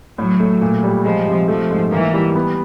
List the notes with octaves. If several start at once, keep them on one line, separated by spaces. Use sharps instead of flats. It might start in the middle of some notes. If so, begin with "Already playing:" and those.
A2 F#3
A3
A#2
G3
F3 G#3
C3
F3 A3
G#2
E3 A#3
G3
B3